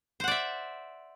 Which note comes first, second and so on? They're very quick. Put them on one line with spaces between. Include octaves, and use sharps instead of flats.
C5 F#5 D5 E5